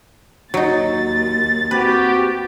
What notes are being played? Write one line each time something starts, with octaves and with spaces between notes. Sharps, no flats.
D#2 F#3 D#4 A6
C4 F#4 G4 B4